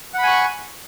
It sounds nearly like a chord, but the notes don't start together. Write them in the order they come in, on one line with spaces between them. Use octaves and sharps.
F#5 B5 G#5 C#6